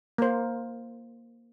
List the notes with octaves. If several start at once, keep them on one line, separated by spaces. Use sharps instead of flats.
A#3 C5